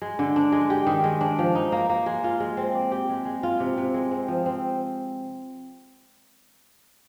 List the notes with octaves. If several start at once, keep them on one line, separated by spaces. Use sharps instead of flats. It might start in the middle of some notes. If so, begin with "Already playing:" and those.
G#3
D3
D4
G#3
G4
D#3
G#3
D4
F3
D#4
A#3
A#3
G#3
F4
G#3
C4
D5
G4
G#3
G#3
F4
C3
C3
G#3
C4
F3
C4